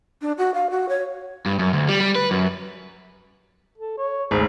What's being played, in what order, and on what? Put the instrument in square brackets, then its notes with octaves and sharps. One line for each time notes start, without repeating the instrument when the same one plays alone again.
[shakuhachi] D4
F#4
F5
F#4
C#5
[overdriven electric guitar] G2
F#2
D2
G3
G3
B4
F#2
[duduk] A4
C#5
[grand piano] G#1 D2 [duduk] G#4